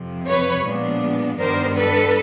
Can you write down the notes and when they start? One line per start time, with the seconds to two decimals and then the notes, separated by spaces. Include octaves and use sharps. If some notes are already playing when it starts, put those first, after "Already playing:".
Already playing: F2 C3 F3
0.27 B4 C#5
0.65 A#2 F3 G#3 B3 D4
1.39 G2 D#3 G3 B3 D4 A#4 C5
1.77 A4 B4